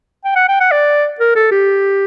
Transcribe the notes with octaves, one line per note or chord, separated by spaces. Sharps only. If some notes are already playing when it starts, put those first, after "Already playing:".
G5
F#5
G5
F#5
D5
A#4
A4
G4